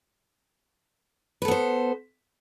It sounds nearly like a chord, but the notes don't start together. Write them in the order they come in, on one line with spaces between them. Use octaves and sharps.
B4 A4 B3 C5